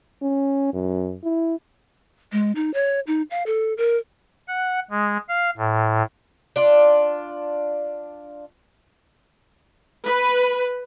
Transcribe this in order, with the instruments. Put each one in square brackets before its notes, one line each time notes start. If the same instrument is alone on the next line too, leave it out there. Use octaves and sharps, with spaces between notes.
[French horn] C#4
F#2
E4
[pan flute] G#3
D#4
C#5
D#4
F5
A4
A#4
[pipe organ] F#5
G#3
F5
A2
[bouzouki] D4 F4
[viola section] B4